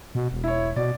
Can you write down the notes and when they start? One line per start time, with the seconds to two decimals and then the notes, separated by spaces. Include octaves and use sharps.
0.15 B2
0.32 E1
0.44 E4 C#5
0.76 B2 D5